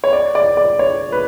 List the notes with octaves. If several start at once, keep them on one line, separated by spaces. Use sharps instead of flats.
C#5
D5
D5
D5
C#5
B4